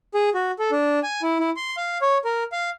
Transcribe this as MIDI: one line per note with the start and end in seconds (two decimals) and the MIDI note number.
0.14 0.30 68
0.35 0.51 66
0.59 0.71 69
0.72 1.00 62
1.03 1.22 80
1.22 1.39 64
1.39 1.50 64
1.57 1.76 84
1.77 1.98 77
2.02 2.18 73
2.25 2.43 70
2.52 2.70 77